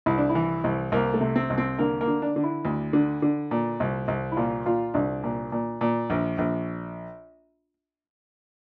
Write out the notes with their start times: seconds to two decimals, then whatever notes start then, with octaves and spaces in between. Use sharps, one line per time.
0.06 C2 E4
0.18 D4
0.29 E4
0.35 E3
0.64 C2
0.92 C2 A#3
1.14 A3
1.21 C3
1.36 C4
1.50 C2
1.58 C4
1.78 D3 A#3
2.01 A#3
2.07 D3
2.22 D4
2.36 D3
2.43 E4
2.65 D2
2.93 D3
3.22 D3
3.51 A#2
3.80 C2
4.08 C2
4.32 E4
4.37 A#2 F4
4.66 A#2 F4
4.94 C2 D4
5.24 A#2
5.52 A#2
5.81 A#2
6.10 A#1
6.38 A#1